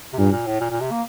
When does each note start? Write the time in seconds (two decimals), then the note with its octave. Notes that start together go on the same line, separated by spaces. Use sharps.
0.13 C3
0.18 G2 A#2
0.32 A#2
0.47 A2
0.60 A#2
0.71 A#2
0.81 C3
0.92 A#3